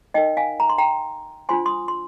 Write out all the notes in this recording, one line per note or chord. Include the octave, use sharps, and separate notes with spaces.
D#4 A#4 D#5 G5
F5 G#5
A#5
C6
G5 A#5
D4 F4 C5 G#5 C6
C6 D#6
C6